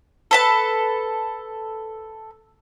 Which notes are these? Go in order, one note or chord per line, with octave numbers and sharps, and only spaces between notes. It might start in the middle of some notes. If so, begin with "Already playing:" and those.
A4 B4 A5